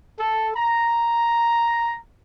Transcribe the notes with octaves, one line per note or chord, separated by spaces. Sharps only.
A4
A#5